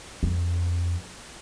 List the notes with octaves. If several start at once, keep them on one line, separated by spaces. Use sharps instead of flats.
F2